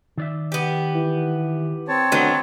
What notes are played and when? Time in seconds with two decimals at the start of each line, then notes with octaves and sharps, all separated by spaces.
0.18 D#3 D5 E5
0.52 B3 G4
0.95 E3
1.88 C4 C#5 A5
2.12 D2 D#3 F#3 B3